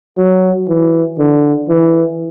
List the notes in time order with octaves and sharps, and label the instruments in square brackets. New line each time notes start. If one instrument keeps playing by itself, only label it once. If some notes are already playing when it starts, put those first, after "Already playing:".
[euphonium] F#3
E3
D3
E3